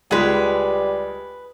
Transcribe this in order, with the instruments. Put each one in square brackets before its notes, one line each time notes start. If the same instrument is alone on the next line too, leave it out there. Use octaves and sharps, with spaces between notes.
[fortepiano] C#2 G#3 [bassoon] G3 [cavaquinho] G#4 B4